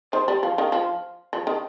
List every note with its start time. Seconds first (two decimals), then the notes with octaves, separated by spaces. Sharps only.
0.13 D#3 C5
0.28 G3
0.43 F3 F5
0.58 D#3
0.72 F3
1.33 F3
1.47 D#3